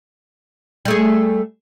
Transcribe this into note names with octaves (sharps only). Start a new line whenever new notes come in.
G3 A3 G#4